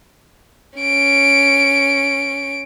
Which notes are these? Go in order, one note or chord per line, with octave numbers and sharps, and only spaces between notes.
C#4 D7